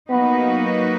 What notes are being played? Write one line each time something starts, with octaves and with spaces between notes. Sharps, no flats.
F#3 A#3 B3 D#4 F#4 B4